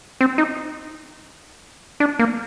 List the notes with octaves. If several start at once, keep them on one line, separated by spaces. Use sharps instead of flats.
C4
D#4
D4
A#3